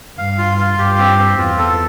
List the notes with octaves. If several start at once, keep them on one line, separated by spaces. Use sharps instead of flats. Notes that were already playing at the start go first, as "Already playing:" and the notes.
G2 F5
F4
F4
G2 G4
C4
C4
E2 F4
A4